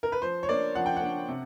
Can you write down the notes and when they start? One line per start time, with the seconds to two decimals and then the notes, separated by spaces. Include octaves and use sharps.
0.03 A#4
0.12 B4
0.22 F3 C5
0.43 C#5
0.49 A#3 D4 D5
0.75 F3 F#5
0.86 G5
0.96 F#5
1.02 A#3 D4
1.28 C3